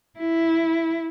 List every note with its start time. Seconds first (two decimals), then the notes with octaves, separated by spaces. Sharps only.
0.18 E4